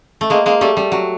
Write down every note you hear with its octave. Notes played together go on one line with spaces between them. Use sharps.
A3
G#3 A#3
G#3 A#3
G3 A3
G3
F#3